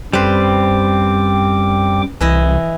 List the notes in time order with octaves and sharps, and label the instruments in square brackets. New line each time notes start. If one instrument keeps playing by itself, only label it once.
[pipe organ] F#2 G5 D6 [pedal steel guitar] G3 C4 [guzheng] B4 C5
[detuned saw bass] C2 [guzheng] E3 E4 D#5